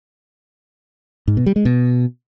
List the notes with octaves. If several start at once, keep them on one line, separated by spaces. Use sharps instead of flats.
G#2
B2
G3
G#3
B2